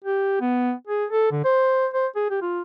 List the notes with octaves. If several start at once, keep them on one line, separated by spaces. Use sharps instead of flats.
G4
B3
G#4
A4
D3
C5
C5
G#4
G4
F4